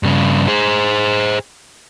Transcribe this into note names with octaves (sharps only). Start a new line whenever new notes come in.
G2 C#3
G#4 C5